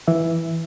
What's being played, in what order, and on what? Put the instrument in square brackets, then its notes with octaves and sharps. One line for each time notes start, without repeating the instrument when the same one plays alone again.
[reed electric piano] E3 E5